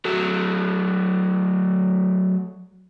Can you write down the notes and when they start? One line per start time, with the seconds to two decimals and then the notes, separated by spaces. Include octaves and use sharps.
0.05 F#3 A3